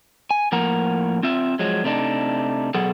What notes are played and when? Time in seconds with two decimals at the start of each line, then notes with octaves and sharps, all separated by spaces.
0.31 G#5
0.52 A2 F3 A#3 A#4 F#5 A#5
1.23 C4 F4 E5
1.59 F3 F#3 G#3
1.84 C3 A3 D4 D#4
2.74 B2 F#3 G#4 A4 F#5